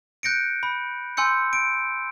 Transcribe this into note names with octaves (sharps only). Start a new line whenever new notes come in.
F#6 G6 A#6 C#7 D7
B5
G#5 C6 E6 G6 C#7
D7